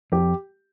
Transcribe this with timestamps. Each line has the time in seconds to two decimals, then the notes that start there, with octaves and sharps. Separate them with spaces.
0.12 F2 G4